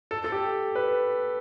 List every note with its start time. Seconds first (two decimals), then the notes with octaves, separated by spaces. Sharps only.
0.11 A4
0.24 A4
0.32 G4
0.75 B4